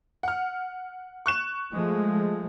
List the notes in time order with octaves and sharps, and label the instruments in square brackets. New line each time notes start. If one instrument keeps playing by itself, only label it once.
[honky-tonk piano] F#5 F6
C#6 F#6 E7
[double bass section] F3 G#3 A3